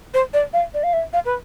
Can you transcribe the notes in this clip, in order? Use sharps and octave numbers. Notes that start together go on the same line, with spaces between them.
C5
D5
F5
D5
F5
E5
F5
B4